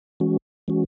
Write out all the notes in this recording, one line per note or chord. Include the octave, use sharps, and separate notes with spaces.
E3 G#3 C#4 F#4
E3 G#3 C#4 F#4